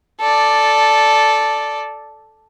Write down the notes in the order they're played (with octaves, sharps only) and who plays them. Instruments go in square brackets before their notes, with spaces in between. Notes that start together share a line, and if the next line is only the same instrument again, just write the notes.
[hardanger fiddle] A4 D5